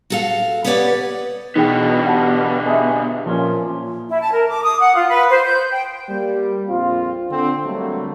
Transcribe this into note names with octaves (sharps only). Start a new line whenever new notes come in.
F#4 A4 F5
B3 G4 B4 C#5 D5 F#5
B2 D3 E3 B3 D#4 G#4 G5
B2 G4 F#5 A5
G#4 D#5 E5
A#2 F3 C#4
E4
A5
A#4
D6
D#6
F#5
F4
B4
C5
G6
G5
G3 A#3
A#1 F2 C4 F4
D3 C4
D3 F#3 G3 A3 A#3 C4